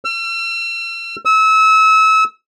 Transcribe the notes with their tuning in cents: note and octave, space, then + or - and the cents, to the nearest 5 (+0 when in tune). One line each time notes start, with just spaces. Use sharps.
E6 +45
E6 -30